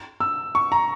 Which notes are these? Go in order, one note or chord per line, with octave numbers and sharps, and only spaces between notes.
E6
C#6
A#5